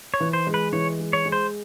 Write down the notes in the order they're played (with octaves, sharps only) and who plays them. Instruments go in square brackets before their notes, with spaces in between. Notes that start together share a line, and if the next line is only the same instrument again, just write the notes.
[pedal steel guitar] C#5
[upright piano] E3
[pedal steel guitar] C5
[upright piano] G#3
[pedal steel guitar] B4
[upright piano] E3 [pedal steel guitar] C#5
[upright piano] G#3
[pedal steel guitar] C#5
[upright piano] G#3
[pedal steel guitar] C5